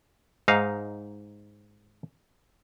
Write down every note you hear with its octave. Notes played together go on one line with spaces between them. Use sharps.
G#2 D#4 F5